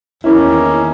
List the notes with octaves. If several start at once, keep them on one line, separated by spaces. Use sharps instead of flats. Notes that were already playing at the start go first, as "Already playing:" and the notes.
E2 D#3 E3 A#3 C#4 E4